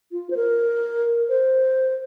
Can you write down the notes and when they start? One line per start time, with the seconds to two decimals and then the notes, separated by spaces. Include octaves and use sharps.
0.12 F4
0.30 C5
0.36 A#4
1.29 C5